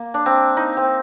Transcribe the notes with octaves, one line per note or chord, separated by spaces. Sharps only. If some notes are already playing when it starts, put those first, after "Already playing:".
Already playing: A#3
D4
C4
D#4
C4